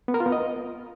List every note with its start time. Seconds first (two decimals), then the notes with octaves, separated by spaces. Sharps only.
0.08 B3
0.14 A#4
0.20 F4
0.26 B3
0.32 D#5